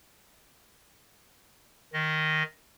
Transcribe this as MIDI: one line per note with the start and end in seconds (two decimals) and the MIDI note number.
1.93 2.43 51
1.93 2.43 75